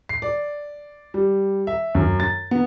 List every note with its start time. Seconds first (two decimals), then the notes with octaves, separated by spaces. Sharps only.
0.09 C7
0.22 D5
1.14 G3
1.67 E5
1.95 F#2
2.20 A6
2.51 B3